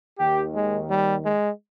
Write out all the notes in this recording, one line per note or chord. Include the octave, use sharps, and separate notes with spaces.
D#2 D#3 G4
G#3
G3
G#3